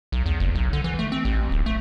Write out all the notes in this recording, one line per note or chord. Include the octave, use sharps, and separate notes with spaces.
B1
E2
F#1
B1
D3
E3
A3
C4
A1
D1
A3